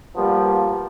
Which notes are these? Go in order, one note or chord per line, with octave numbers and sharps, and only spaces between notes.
F3 G3 A#3 B3